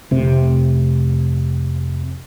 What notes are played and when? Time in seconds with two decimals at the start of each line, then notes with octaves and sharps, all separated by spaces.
0.11 F1 C3